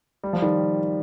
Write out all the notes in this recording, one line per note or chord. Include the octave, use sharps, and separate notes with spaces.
G3
F3
D#3 G3